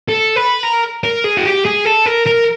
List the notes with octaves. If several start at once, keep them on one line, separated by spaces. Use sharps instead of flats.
A4
B4
A#4
A#4
G#4
F#4
G4
G#4
A4
A#4
A#4